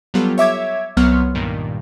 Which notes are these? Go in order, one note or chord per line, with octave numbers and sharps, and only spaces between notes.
F#3 G3 B3 F4 G4 A4
C#5 E5 D6 G#6
C2 F#3 B3 C#5 C6 F6
G2 A#2 D#3 G3